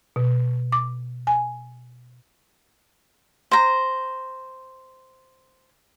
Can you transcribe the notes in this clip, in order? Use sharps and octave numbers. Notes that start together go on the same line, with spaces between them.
B2
D6
G#5
C5 A#5